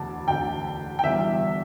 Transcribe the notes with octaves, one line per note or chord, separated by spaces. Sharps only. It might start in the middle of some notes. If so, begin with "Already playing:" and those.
Already playing: E1 D2 D3 A5 D6
E1 D2 D3 G5
G5
E1 E2 D3 G3 E5